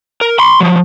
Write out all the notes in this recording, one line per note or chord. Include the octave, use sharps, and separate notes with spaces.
A#4
B5 C6
F3 F#3